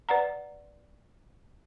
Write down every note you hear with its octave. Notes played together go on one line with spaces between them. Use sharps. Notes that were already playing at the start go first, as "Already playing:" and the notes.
B4 D5 F#5 A#5